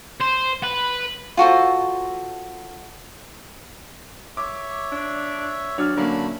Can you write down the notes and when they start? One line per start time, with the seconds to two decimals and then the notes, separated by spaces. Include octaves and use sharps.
0.21 C5
0.63 B4
1.37 F4 F#4 A4 C5
4.37 C#5 E5 D6
4.92 D4
5.78 F#3 D4 C#5 D5 F6
5.97 D3 F#3 A3 A#3 C#4 B5